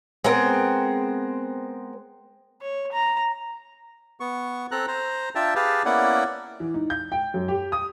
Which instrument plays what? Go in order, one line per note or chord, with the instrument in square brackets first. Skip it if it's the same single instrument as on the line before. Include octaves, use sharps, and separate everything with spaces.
[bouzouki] G#3 B3 C4 A#4
[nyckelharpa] C#5
A#5
[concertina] B3 C#6
C4 A4 A#5 F#6
C5 A#5
D4 F4 E5 G5 A5
G4 G#4 B4 F5 A5
A#3 B3 C#4 E4 D5 F#5
[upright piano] E3
D#4
G6
G5
F#2
G4
D#6